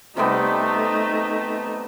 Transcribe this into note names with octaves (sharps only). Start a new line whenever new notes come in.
C3 G3 A3 B3 D#4